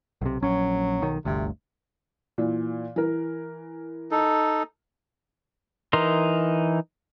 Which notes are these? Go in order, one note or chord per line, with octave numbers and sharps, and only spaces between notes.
B1 C3
A#1 F#3 C#4
B1 D#3
G1 D2 C3
A#2 E3
E3 A#4
D#4 A4
E3 D#4 A#4 C6